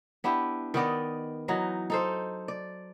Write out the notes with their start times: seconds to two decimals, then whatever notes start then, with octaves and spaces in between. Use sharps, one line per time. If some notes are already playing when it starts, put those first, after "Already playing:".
0.24 B3 D4 E4 G4
0.74 D#3 B3 D5 D#5
1.48 E3 F#3 D#4
1.90 D#4 A4 C5
2.48 D5